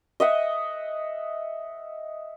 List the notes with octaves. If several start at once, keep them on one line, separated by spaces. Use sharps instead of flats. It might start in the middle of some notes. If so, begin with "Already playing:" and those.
D#5 E5 F#5